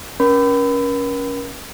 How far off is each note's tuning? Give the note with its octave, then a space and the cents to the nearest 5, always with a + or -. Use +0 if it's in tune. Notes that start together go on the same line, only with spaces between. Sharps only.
C#4 +10 A#4 +40 B5 +30